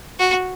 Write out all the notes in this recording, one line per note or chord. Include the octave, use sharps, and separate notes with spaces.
F#4